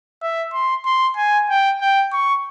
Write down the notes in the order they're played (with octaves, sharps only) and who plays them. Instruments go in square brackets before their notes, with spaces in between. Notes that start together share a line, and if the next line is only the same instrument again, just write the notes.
[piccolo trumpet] E5
C6
C6
G#5
G5
G5
C#6